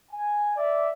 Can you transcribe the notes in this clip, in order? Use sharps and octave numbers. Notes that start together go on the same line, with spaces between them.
G#5
D5 E5